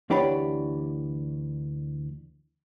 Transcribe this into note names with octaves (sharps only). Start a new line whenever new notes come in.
D2 E3 D4 G4 C#5 B5